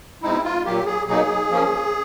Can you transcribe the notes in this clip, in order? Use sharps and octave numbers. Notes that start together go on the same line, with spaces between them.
B2 G#3 C4 D#4 E4
F4
A#2 F#3 A#3 G4
G#4
B2 F#3 A#3 D#4 G#4
F3 A#3 C#4